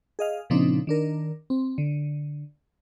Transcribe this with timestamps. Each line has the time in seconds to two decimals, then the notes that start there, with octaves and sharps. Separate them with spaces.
0.19 G#4 D#5 F5
0.50 A#2 C#3 F3 C4 D4 D#4
0.87 D#3 D4 A#4
1.50 C4
1.78 D3